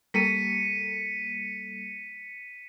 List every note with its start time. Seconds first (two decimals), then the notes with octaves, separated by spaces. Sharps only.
0.14 G3 A#3 A4 B6 C#7 D#7